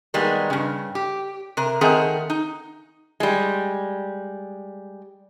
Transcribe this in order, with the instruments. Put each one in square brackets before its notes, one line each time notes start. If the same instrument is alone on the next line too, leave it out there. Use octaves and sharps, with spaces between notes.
[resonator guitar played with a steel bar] D#3 G3 G#3 A#3 B3
G2 C#3
G4
C3 A#4
D#3 A3 C4 G#4 A#4 F#5
D#4
G3 G#3